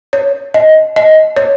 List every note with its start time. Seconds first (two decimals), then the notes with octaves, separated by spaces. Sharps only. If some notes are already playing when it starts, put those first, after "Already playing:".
0.13 C#5
0.54 D#5
0.96 D#5
1.37 C#5